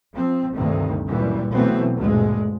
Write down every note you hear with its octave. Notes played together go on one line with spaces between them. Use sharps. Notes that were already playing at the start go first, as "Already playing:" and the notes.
F3 C4
D2 G2 C3 D#3
F#2 A#2 E3 G3
B2 E3 F#3 A3 B3 C4
D2 G2 A#2 G#3